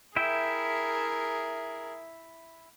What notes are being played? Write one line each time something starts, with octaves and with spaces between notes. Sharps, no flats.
E4 G#4 A#4 E5 G5